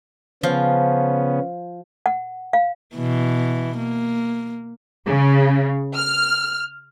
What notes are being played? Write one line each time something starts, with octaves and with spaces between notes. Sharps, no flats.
C#3 F3 B3 C#4 F4
F#5
F5
B2 E3
A#3
C#3
F6